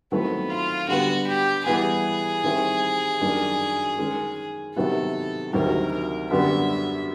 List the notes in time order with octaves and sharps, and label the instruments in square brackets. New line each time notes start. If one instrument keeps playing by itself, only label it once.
[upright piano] D#3 F#3 A3 C4 E4 [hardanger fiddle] B3
[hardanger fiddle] F4
[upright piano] D3 G3 B3 [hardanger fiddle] F#4
[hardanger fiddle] G4
[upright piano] E3 G3 B3 [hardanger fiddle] G#4
[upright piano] D#3 G3 C4 E4
F#2 D#3 G3 A#3 D4
D#3 G#3 C#4
[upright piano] C3 D#3 F#3 B3 E4 [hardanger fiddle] A4
[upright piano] D2 C3 D#3 F#3 [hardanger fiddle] A#4
[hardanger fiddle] A#4
[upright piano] F#2 D3 G3 B3 [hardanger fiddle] E5